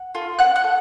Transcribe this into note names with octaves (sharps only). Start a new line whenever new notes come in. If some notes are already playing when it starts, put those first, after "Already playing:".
Already playing: F#5
F4 A4
C4 F#5 F#6
F#5 F#6
A4